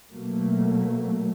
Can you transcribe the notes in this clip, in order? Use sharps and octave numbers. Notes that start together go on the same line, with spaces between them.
B2 F#3 A3 A#3